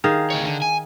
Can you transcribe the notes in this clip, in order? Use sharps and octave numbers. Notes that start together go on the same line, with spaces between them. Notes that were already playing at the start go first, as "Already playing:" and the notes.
D#3 G#4 F5
D2 C#5
D3
G#5